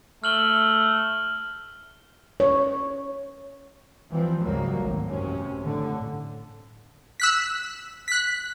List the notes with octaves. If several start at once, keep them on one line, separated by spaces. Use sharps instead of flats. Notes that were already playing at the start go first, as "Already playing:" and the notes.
A3 F6 F#7 G7
C#5
E3 F3 G3 C4
C#2 G#2 F#3 G3 A#3
G#1 A2
A1 F#2 C3 C#4
A2 D3
E6 F#6 B6
F#6 B6